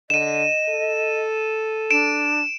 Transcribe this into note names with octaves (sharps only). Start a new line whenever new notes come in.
D3 D#5 D#7 E7
A4
D4 D7 E7